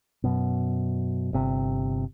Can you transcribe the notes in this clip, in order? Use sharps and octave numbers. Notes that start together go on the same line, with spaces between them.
F#2 B2
G1 C3